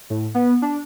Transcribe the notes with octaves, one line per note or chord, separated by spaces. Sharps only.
A2
B3
D4